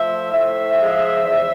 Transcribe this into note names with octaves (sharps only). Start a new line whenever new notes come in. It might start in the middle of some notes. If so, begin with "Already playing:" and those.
Already playing: F3 A3 C5 E5
A2 C5 E5
F3 G#3
E2